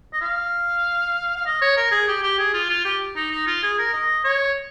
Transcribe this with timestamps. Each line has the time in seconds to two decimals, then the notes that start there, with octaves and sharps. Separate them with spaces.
0.13 D#5
0.21 F5
1.37 F5
1.46 D#5
1.62 C#5
1.77 A#4
1.91 G#4
2.08 G4
2.23 G4
2.39 G#4
2.54 F4
2.70 F4
2.85 G4
3.16 D#4
3.31 D#4
3.47 F4
3.63 G#4
3.79 A#4
3.94 D#5
4.25 C#5